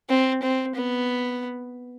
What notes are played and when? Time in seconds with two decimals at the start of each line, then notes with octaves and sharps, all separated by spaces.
0.09 C4
0.43 C4
0.75 B3